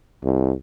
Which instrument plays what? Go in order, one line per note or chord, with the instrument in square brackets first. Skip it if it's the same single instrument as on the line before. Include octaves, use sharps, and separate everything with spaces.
[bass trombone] C2